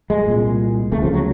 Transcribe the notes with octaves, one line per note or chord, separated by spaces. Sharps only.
G#3
C2 A#2
D2 C#3 A3
F3
F#3